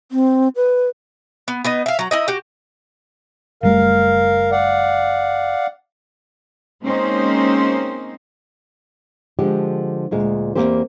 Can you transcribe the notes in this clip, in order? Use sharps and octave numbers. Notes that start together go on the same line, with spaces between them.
C4
B4
B3
B3 D#4 D#5
E5 F5
F#3 A#5
D#4 E4 D#5
F#4 G4
F#1 G3 A3 A#4 F5
D5 F5 F#5
G#3 A#3 C4 C#4 D#4 C5
D3 F3 G#3 G4
D2 A#2 G#3
E2 G#2 A#3 C4 G4 C5